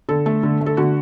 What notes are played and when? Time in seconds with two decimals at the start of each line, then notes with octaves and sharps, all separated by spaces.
0.09 D3 A4
0.26 A3
0.43 D3
0.61 A3
0.66 A4
0.77 D3 F#4